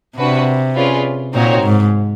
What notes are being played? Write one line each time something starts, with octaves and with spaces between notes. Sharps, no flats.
C3 D4 F#4 B4
C#4 F4 G#4 B4 D5
A#2 C4 D#4 F#4 A#4 C#5
G#2